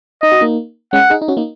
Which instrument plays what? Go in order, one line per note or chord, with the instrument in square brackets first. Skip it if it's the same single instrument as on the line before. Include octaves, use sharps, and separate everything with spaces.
[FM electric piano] D#4 [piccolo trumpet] D#5
[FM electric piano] F#4
A#3 D#4
[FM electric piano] G#3 C#4 [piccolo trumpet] F#5
[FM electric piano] D#4 G#4
D#4
C#4 F#4
A#3 D#4